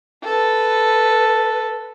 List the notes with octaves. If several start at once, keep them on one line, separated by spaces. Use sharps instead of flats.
A4 B4